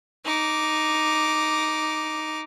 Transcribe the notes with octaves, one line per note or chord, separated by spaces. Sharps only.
D#4 D6